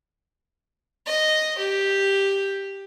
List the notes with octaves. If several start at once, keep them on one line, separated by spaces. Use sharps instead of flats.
D#5
G4